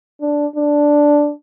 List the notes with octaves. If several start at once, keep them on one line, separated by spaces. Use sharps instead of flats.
D4
D4